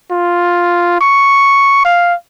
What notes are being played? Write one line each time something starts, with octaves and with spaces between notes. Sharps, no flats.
F4
C#6
F5